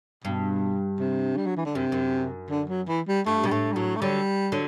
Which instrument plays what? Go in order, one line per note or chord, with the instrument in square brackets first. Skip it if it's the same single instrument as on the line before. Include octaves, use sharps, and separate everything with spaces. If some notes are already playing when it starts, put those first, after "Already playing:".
[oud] G2 [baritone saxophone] B2
[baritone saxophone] C3
G3
F#3
E3
D3
[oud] F#2 [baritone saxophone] C3
[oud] F#2
[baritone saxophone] D3
F#3
E3
G3
[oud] G2 [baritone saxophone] A3
[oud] B2
[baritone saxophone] G3
[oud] A2 [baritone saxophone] A3
[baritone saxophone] G3
[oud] A2 [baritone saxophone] F#3
[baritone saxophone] A3
[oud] D3 F#3 [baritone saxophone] G3
[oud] D3 F#3